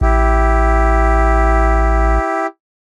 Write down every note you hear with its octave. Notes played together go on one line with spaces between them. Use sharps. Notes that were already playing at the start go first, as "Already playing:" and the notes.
A1 E4 G4